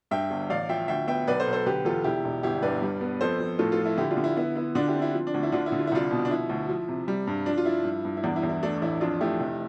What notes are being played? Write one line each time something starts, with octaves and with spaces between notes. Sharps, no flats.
G2 E5 G5
G1
A1 D5 F5
F3 E5 G5
D2 E5 G5
B3 E5 G5
B1 B4 D5
A4 C5
B1
A4 C5
D3 G4 B4
E2 F4 A4
E1 E4 G4
E1
G1 E4 G4
G2 B4 D5
G3
B3
F2 A4 C5
F2
A2 F4 A4
F4 A4
F3
E4
D3 E4 G4
D4 F4
D3
E4
B3 E4
B3 E4
D3 D4 F4
E4 G4
C4
E4
F3
D4
D2
E4
D3 D4 F4
E4
D3
F4
E4
C2 D4 F4
B2
D4
F3 E4
D2
F3
C3
G3
G2
F3 D4
F4
F3 E4
G2
G2
E4
E2 D4
E4
E2
E4
A3 D4
D4
A1 E4
F2 D4 F4
A3 E4 G4
F1